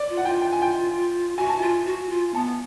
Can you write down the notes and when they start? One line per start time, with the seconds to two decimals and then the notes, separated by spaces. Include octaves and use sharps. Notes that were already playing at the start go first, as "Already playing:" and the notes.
Already playing: D5
0.09 F4
0.17 F#5
0.25 F4 G5
0.41 G5
0.52 G#5
0.62 G5
1.37 F#4 G#5
1.48 A5
1.59 F4 G#5
1.86 F#4
2.10 F4
2.35 B3 A5